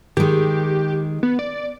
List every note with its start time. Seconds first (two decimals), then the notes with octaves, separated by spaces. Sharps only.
0.17 D#3 G#3 G4
1.23 B3
1.39 D5